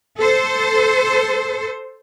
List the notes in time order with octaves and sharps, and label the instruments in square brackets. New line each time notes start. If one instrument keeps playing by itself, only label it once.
[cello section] A4 C5